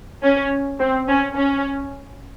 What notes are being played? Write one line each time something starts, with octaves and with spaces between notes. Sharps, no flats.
C#4
C4
C#4
C#4